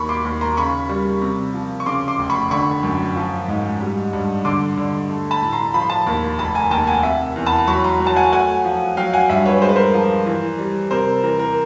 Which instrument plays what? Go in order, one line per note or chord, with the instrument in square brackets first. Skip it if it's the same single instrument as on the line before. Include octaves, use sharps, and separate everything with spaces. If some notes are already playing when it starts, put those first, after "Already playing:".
Already playing: [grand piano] D#2 B5 C#6
C6 D6
D#2
A#5 C6
C#3 B5 C#6
G3
C3
F3
C#6
C#3 C6 D6
C6 D6
F1
B5 C#6
D3 B5 C#6
F#2
F3
G#2
G3
G2
D3 C6 D6
D3
A3
A5 B5
A2
A#5 C6
F3 B5
C6
A5 B5
D#2
F1 A5 B5
G#5 A#5
D#2 G5 A5
F#5 G#5
C3 E5 F#5
E2
A5 B5
F#3 B5 C#6
A#5 C6
F#3
A5
F#5 G#5
A3 F#5 G#5
F3
F#3 F5 G5
F#5 G#5
G2 E5 F#5
B4 C#5
G#3 C5
B4
A#4 C5
F3
E3
G3
C3 A#4 C5
E3 A#4
A#4